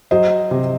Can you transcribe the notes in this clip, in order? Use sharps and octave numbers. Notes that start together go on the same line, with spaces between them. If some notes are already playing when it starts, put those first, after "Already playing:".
F#3 C5 D#5
C3